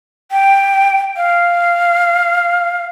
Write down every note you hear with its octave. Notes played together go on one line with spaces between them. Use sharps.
G5
F5